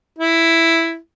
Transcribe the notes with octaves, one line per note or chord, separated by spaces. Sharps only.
E4